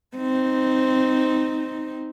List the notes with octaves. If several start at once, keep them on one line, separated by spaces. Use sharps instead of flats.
C4 D#4